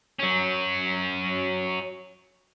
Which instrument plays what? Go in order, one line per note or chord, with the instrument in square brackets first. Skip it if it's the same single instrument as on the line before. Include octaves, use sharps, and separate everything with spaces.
[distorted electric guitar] F#3 C#4